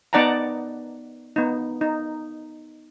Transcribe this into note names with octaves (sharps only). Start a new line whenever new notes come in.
B3 D#4 D5 F#5 A5 A#5
B3 D#4
D#4